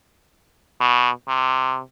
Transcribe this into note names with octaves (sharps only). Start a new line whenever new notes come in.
B2
C3